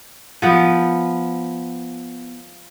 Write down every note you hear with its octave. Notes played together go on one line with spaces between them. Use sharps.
F3 B3